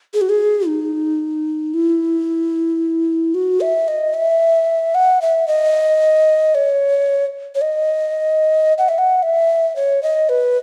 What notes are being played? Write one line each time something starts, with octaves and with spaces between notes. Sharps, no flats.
G#4
F#4
G#4
D#4
E4
F#4
E5
D#5
E5
F#5
E5
D#5
C#5
C#5
D#5
F#5
E5
F#5
E5
C#5
D#5
B4